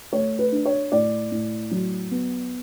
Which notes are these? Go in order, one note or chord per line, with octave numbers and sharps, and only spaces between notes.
A3 C#5
B4
D4
C#5
A2 D5
A2
F#3
B3